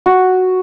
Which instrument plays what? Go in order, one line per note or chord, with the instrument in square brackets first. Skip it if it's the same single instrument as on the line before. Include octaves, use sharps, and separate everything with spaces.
[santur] F#4